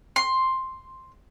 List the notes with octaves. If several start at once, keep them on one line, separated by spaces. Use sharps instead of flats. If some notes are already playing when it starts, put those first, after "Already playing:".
C6